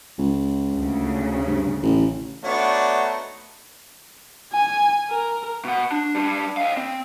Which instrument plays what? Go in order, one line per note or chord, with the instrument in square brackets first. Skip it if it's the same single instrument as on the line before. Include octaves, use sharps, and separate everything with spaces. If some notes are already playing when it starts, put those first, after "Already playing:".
[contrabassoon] C#2
[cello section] D2 C#3
[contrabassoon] G2
A1
[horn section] A3 B3 D#4 [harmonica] D4 F#4 C#5
[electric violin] G#5
A#4
[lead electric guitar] B2 F#5
D4
G3 D4
D#5 F5
C4